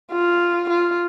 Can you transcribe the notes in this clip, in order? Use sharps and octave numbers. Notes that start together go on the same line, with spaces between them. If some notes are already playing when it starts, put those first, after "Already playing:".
F4
F4